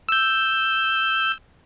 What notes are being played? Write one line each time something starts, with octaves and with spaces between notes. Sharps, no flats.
E6 G6